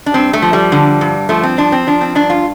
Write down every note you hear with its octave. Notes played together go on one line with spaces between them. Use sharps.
D4
G2 C4
A3
F3
G3
D3
G2
F3 A3
C4
F3 D4
C4
F3 D4
C4
G2 D4
F4